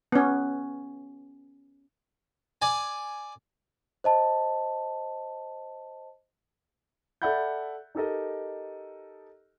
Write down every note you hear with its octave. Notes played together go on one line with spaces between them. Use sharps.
B3 C#4
D5 G#5
C5 D#5 A5
A4 D5 E5 F#5 B5 G6
D#4 G4 A4 A#4 D#5